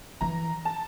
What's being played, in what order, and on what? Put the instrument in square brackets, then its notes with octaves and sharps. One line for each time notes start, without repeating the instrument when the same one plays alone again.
[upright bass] E3 [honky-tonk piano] A#5
[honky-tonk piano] A5